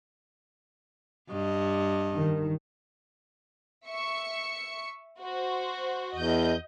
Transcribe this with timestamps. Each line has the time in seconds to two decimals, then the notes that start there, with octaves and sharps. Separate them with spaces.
1.31 G2 D#5
2.14 D#3
3.87 E5 C#6 C#7
5.22 F#4 C5
6.16 E2 D#5 G6